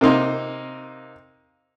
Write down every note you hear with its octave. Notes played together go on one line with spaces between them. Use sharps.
C3 A#3 C4 D#4 C6